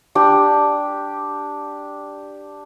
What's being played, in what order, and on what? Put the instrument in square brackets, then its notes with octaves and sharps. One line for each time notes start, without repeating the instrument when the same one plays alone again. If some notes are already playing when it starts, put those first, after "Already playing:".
[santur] D4 G4